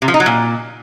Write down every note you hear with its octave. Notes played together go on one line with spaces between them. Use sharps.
C3
F3
D#4
F#3
A#2